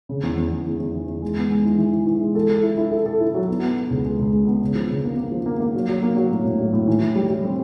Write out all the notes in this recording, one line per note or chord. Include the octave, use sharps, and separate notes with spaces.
C#3
E2
E2
E2
E2
E2
E3
E2
G#3
B3
G#3
E3
E3
E3
E3
G#3
A4
A4
E4
E4
A4
A4
E4
F#3
B3
B3
B3
C#2
G#3
C#2
G#3
B3
C#3
F3
C#3
A#3
A#3
F3
A#3
A#3
F#3
F#3
A#3
F#3
A2
A2
F#3
A2
E3
E3
G3
G3
C4